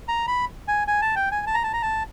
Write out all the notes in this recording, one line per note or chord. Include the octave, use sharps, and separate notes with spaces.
A#5
B5
G#5
G#5
A5
G5
G#5
A5
A#5
A5
A#5
A5